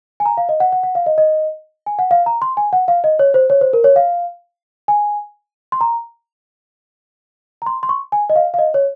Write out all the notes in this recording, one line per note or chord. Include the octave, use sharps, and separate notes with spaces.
G#5
A#5
F5
D#5
F#5
F#5
F#5
F5
D#5
D#5
G#5
F#5
F5
A#5
C6
G#5
F#5
F5
D#5
C#5
C5
C#5
C5
A#4
C#5
F5
G#5
C6
A#5
A#5
C6
C6
C#6
G#5
D#5
F5
F5
D#5
C#5